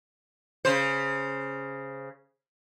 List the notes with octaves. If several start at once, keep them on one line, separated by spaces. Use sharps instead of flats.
C#3 C5